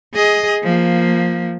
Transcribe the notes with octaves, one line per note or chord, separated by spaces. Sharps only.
G#4 D#5
F3 A#3